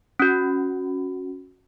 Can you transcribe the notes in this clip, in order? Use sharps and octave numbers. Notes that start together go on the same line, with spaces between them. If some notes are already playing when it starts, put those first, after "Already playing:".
C#4 F#4